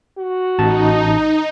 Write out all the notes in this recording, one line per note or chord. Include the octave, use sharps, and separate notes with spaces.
F#4
A1 D#4 A5